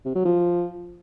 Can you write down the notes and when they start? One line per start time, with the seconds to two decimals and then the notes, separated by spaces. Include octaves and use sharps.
0.05 C3
0.15 F#3
0.25 F3